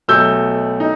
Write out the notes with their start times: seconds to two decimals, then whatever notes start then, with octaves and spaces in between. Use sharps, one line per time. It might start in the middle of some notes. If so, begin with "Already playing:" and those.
0.08 B1 B2 A3 E6 G6
0.80 D#4